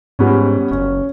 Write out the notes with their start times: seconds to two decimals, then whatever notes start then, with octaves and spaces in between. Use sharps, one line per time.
0.19 G#2 G3 B3 C#4
0.71 F#1 C#4